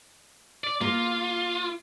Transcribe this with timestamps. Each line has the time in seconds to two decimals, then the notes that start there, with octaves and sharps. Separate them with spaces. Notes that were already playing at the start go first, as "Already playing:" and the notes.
0.64 D5
0.81 A#3 F4